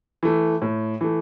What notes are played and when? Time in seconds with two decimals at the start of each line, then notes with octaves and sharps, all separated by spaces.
0.23 E3 A3
0.62 A2
1.01 E3 A3